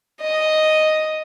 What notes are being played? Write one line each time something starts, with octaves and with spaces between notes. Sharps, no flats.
D#5